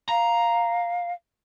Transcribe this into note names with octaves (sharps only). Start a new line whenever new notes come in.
F5 A#5